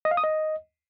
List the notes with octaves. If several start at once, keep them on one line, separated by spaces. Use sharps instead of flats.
D#5
F5
D#6
D#5